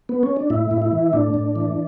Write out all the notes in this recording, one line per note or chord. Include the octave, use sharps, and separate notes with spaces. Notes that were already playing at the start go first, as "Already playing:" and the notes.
B3
C#4
D4
A2 E4
A2
E4
E3
A2 D4
A2
E3